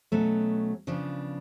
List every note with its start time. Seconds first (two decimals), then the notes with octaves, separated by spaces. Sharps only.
0.12 B2 F#3 A3 C#4
0.87 C#3 F3 B3 D4